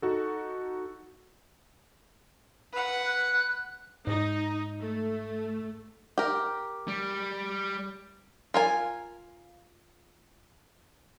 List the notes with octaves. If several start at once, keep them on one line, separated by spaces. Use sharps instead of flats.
D#4 F#4 A4
B4 F#5
F#6
G#2 D#4
A3
G4 A#4
G3
F4 A#4 G#5